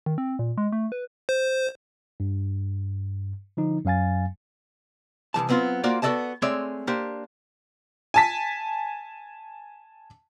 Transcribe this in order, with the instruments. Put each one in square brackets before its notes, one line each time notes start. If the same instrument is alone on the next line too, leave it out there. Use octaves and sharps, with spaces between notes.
[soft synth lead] D#3
C4
A#2
G#3
A3
B4
[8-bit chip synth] C5
[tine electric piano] G2
D3 F3 D#4
F#2 F#3 F5 G#5 A6
[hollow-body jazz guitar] C2 F2 E3 A5
F#3 B3 C4 D4 F4
A#3 F4 F#4 C5 D5
B3 F#4 A4 D5 D#5 A5
G#3 A3 C4 C#5 D5 E5
A#3 D4 G4 C5
[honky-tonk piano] G#5 A5 B6